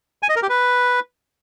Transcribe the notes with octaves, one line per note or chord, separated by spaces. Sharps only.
G#5
D#5
A#4
G4
B4